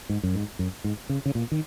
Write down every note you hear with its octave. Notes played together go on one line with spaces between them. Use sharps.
G#2
F#2
G#2
F#2
G#2
C#3
C#3
A#2
D#3